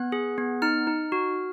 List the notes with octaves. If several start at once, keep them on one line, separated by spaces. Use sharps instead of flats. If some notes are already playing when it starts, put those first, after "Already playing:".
Already playing: B3 F#6
G#4
B3
D#4 F6
D#4
F#4